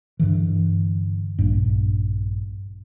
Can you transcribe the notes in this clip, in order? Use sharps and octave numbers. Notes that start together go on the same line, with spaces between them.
G2 D3 E3
A#1 G2